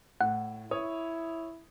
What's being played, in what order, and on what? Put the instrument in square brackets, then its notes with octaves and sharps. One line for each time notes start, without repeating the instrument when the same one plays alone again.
[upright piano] A2 [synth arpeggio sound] F#5
[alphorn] E4 [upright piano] C#5 D#6